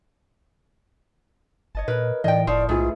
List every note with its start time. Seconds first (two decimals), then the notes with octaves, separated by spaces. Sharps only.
1.75 G1 C#5 D#5 A5
1.88 A#2 A#4 B4
2.24 A2 E3 D5 D#5 G5
2.47 F1 F3 D5 C#6 D#6
2.69 B1 G#2 A3 B3 E4 F4 G#4